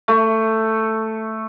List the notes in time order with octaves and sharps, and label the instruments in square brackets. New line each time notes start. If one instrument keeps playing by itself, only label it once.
[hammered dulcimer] A3